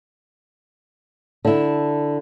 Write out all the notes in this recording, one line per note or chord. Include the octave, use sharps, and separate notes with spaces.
D3 E4